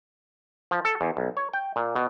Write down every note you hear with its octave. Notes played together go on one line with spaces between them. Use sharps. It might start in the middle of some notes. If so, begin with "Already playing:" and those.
F3
A4
E2
B1
C#5
G5
A#2
B2